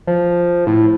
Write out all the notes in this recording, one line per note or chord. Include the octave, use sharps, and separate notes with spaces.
F3
A2